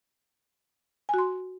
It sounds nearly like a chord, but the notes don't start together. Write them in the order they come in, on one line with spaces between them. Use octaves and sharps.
G#5 F#4 C6